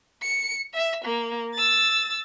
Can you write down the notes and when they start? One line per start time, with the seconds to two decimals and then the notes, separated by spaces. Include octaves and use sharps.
0.22 C#7
0.74 E5
1.04 A#3
1.55 E6 A6